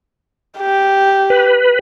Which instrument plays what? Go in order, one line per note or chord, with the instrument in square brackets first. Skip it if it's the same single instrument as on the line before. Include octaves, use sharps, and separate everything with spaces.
[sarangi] G4
[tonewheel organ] B4